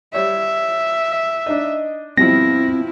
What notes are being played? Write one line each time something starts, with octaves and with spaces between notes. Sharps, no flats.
G3 C#5 D5 E5
D4 D#4 D#5
G2 B2 F3 C4 E4 A#6